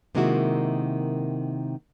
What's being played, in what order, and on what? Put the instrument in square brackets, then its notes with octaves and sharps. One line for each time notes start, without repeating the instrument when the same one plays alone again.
[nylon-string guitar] C3 D#3 G#3 A#3 E4 F#4